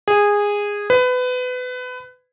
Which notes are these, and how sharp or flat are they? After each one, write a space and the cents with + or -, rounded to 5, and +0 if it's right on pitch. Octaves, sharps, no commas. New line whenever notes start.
G#4 -15
B4 +25